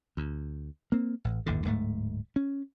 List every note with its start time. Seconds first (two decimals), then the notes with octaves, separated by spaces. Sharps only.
0.17 D2
0.92 A#3 C4
1.24 A1
1.46 G1 D#2 A2 D3
1.64 D1 G#2 A3
2.36 C#4